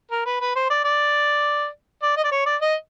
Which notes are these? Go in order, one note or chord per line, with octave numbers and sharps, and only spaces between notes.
A#4
B4
B4
C5
D5
D5
D5
D#5
D5
C#5
D5
D#5